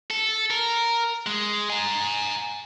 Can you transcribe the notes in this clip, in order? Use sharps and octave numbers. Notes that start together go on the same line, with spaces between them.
A4
A#4
G#3
G#5 A#5